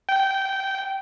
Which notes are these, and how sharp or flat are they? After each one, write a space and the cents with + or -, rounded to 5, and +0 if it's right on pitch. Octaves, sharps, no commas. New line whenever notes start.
G5 -15